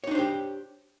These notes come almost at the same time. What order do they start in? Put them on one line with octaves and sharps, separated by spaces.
C#5 D#4 D4 C5 G4